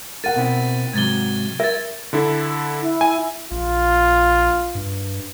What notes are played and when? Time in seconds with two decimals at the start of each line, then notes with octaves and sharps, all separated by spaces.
0.24 A#4 F#5 A6 D#7
0.36 B2 C4 E4
0.94 G#2 C3 F#3 G#6 A6 G7
1.60 A#4 E5 G#6 A6
2.13 D3 E4 A4
2.80 E4
3.01 G#5
3.51 A#1 F4
4.75 G2